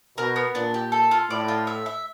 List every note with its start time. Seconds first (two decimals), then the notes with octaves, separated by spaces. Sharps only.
0.17 B2 A#4
0.36 B3
0.55 A#2 D4
0.74 G4
0.92 A4
1.11 F4
1.30 A2 D5
1.48 F4
1.67 E5
1.86 E5